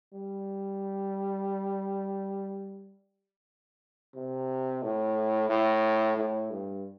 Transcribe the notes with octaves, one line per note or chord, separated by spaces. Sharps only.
G3
C3
A2
A2
A2
G2